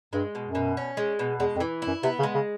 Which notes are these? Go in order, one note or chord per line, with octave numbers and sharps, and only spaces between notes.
G2 G#3
B2
F#2
B2
C#4
G#3
B2
E2 G#3
F2
E3
E4
F#2
C3 B3
C#3
G#3
C#3